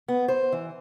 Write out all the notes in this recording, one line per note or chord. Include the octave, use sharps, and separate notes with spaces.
B3
C5
E3